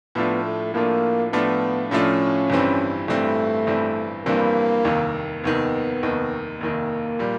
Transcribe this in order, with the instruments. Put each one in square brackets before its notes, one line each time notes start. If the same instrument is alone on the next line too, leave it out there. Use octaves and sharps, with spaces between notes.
[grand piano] A2 F3 A3 D4 F4 [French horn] B3
[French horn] A3
[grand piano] A2 F3 A3 D4 F4 [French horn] A#3
[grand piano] A2 F3 A3 D4 F4 [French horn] B3
[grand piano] A2 F3 A3 D4 F4 [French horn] C#4
[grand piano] G1 G2 E3 G3 C4
[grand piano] G1 G2 E3 G3 C4 [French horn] A3
[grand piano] G1 G2 E3 G3 C4
[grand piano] G1 G2 E3 G3 C4 [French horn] A#3
[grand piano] F1 D#2 D#3
[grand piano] F1 D#2 D#3 [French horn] B3
[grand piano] F1 D#2 D#3
[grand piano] F1 D#2 D#3 [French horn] A#3
[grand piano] A#2 G3